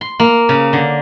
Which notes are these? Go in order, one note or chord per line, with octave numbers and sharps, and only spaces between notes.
C6
A#3
C#3
D3